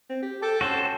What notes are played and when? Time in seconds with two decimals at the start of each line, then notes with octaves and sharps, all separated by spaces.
0.10 C4
0.22 G4
0.42 A4 G5 A5 D6
0.61 C#4 F#4 A4 C5
0.75 C#4